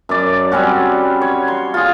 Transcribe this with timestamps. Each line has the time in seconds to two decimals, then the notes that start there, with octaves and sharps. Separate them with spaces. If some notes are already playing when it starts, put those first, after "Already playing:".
0.09 F#2 D5
0.52 G3 C4 C#4 F#4
1.21 C#5
1.48 C6
1.74 F4 G#4